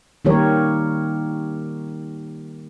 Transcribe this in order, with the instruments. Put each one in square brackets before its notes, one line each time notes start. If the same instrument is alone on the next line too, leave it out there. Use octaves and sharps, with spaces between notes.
[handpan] D#3 G3 A#3 G4 A#4 C#5